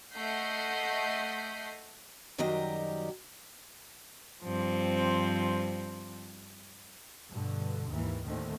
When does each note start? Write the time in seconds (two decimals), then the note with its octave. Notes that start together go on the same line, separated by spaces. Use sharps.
0.14 A3 D#5 F#5 G6 B6 C7
2.38 F#2 D#3 F#3 G3 G4 D#5
4.42 G2 F3 C4
7.31 G2 B2 D3
7.90 D#2 G#2 E3
8.26 D#2 A2 D3 D#3 A3 C4